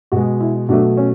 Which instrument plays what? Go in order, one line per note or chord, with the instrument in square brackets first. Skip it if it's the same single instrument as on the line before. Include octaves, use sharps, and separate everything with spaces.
[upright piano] B2 G#3 F#4
E4
B2 F#3 A3 D4
C#4